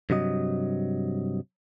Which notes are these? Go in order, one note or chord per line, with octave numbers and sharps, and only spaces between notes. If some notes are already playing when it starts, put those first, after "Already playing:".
G2 C3 F#3 D#5